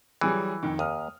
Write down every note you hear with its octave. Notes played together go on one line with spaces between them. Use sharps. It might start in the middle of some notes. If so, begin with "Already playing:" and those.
E3 F#3 G3 G#4
F2 D#3
D#2 D#6 F6